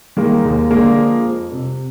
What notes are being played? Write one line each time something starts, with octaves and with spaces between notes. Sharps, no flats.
D#3 G#3 A#3
D#2
D3 G#3 A#3
F3
F2
C3